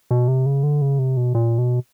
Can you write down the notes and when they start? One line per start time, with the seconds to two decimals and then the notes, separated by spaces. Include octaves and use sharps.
0.11 B2
0.28 C3
0.46 C#3
0.63 D3
0.81 C#3
0.99 C3
1.17 B2
1.35 A#2
1.58 B2